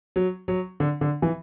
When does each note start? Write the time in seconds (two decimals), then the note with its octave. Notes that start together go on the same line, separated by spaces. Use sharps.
0.16 F#3
0.48 F#3
0.80 D3
1.01 D3
1.22 E3